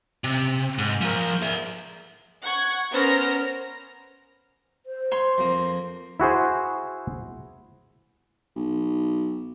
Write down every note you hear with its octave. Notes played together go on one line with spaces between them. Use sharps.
C3
G#2
F3 A#4
G#4 E5
F#5 C#6 G#6
B3 C#4 A#4 C5 F6 A#6
C5
C#5 C6
F2 A#3
E4 F#4 G#4 C5
B1